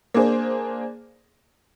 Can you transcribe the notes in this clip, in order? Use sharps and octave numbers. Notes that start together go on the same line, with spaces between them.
A#3 D4 G#4 C5